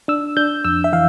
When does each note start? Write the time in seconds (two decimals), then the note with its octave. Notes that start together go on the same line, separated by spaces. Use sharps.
0.08 D4 E6
0.37 D4 G6
0.65 F2 E6
0.84 E5
0.93 E3 F5